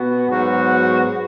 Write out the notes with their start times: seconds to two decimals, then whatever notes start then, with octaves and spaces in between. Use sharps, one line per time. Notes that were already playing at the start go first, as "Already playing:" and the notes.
Already playing: B2 B3 F#4
0.28 G#2 F#3 B3 F#4